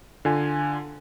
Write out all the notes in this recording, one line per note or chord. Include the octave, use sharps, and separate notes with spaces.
D3 F4 G#5